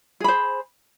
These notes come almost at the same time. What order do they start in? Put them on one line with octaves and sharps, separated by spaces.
G#4 B5 C5